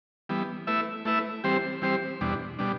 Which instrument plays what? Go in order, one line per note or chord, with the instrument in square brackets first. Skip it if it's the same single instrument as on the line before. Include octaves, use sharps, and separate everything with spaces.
[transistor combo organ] E3 G3 B3
A3 E4 B4 E5
A3 E4 B4 E5
E3 G3 C4 G4 C5
E3 G3 C4 G4 C5
E2 B2 G3 D4
B2 G3 D4